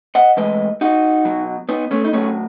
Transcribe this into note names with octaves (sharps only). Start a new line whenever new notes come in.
D#5 F#5
A2 E3 G#3 B4 D#5
D#4 F#4
B2 F#3
B3 D#4
A3 C#4
D#4
A2 F#3 A3 C#4